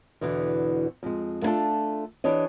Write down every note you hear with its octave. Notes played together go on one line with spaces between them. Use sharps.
E2 B2 D3 E3
F2 G#3
A3 B3 D4 F4 A4
E3 D4 G4 C#5 D#5